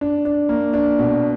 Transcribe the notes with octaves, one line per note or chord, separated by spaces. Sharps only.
D4
D4
A#3
D4
B2